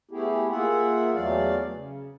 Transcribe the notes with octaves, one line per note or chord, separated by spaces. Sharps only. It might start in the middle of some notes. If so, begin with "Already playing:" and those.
A3 B3 E4 G4 G#4
A#3 F4 G#4 E5 F#5
E2 E3 F#3 A3 D5 F5
C#3